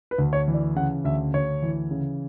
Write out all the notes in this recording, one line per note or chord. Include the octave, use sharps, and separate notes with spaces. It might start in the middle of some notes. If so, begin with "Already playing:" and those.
B4
D2
C#5
E3
D5
C#3 F#5
D2 E5
D2 C#5
E3
C#3